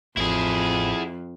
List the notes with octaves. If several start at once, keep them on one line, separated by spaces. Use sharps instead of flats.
A1 F2 E4 G#4